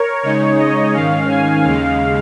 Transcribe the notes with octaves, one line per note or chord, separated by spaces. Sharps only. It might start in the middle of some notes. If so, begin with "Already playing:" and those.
Already playing: A#4 C#5
C#3 G#3 D#4 C#5
D#5
G#2 D#3 C#4 F5
G#5
D#2 C#3 G#3 F5